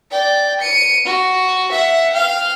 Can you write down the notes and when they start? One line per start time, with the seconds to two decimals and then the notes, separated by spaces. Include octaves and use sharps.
0.11 D5 G5
0.60 C#7 D#7
1.05 F#4
1.70 E5 F#5
2.12 F5 G5